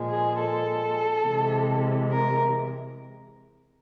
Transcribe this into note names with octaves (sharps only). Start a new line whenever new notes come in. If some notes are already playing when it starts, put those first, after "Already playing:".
Already playing: A#2 F3 G#3
G#4
A4
C3 E3 G#3
A#4